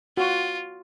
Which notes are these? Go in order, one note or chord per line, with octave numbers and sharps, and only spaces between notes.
F4 F#4